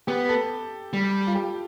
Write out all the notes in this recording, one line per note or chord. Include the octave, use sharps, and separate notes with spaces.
B3 G4
A4
G3
F4
G4